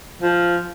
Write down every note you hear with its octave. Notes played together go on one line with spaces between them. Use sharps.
F3